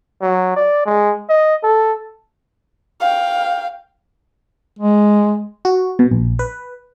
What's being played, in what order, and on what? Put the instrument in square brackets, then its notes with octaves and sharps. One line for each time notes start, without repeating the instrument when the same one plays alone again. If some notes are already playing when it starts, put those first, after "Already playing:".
[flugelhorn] F#3
D5
G#3
D#5
A4
[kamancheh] F5 G5
[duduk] G#3
[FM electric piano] F#4
B2
A#1
B4